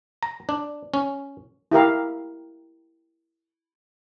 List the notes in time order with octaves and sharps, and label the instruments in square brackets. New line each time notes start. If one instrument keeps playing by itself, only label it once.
[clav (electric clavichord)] A#5
D4
C#4
[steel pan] E4 G4 A#4 F5